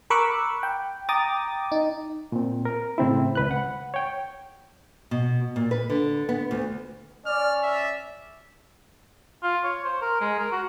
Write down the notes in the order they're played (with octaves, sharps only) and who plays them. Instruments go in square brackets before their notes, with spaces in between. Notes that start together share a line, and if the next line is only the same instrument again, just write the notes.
[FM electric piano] A#4 B5 C#6 D6 E6 F#6
G5
G5 A#5 D6 D#6 A6
D#4
[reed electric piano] A#2 C4
A#4
A2 C#3 C4 E4
C#2 B4 F#6
F#5
C#5 G5
[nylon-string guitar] B2
A#2
B4
D3
B3
D2
[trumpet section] C#4 D5 [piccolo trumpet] F6
[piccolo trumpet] E5
[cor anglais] F4
C#5
C5
A#4
G#3
A#4
F#4